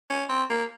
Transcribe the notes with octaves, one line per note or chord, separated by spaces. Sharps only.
C#4
C4
A#3